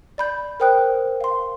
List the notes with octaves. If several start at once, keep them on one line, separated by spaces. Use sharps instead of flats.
D5 B5 G6
A#4 C5 G5 D#6 F#6
F5 C6